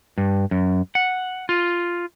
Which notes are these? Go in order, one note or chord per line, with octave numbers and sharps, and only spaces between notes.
G2
F#2
F#5
F4